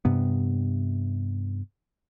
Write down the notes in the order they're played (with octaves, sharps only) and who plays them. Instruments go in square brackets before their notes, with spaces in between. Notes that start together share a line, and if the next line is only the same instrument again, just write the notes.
[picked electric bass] G2 C3 B3